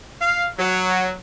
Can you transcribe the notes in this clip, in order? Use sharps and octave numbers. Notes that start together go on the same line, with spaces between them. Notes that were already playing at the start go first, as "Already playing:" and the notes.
F5
F#3